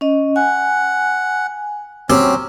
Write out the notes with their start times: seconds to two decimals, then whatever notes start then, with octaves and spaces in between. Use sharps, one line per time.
0.01 C#4 D#5
0.36 F#5 G#5
2.10 F#3 C4 C#4 G4